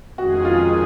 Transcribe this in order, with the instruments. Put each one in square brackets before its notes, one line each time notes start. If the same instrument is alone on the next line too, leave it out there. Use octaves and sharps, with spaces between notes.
[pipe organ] F2 D#3 G#3 C#4 G#4 [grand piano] F#4
[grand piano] F4